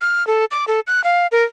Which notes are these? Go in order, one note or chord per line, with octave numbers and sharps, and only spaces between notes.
F6
A4
D6
A4
F#6
F5
A#4